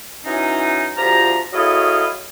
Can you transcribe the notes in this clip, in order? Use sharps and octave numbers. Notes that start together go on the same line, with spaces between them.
E3 F#3 C#4 D#4
D2 F3 F4 G4 A#5
F#3 A3 E4 G#4 D#5 F5